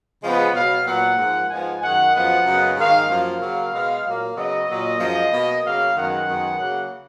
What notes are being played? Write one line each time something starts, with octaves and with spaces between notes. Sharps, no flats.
C#3 F3 G#3 B3
B2 F#3 B3 F5
A#2 F#3 B3 F#5
G#2 F3 A#3
G#2 F3 G#3 B3 G#5
F#2 D#3 G#3 F#5
F#2 F3 G#3 B3 F#5
F#2 C#3 G#3 B3
G#2 D#3 A#3 F5
F#2 F3 A#3 F5
C#3 F#3 A#3
B2 G#3 B3
A#2 F#3 A#3
C#3 F#3 B3 D#5
A#2 F#3 A#3
F#2 F3 G#3 D#5
B2 A#3
C#3 F#3 A#3 F5
F#2 D#3 G#3 B3 F#5
F#2 D#3 G#3 B3
C#3 F#3 A#3